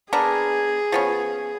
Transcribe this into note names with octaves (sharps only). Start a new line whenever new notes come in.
B3 D4 G#4 A#4
F3 B3 C#4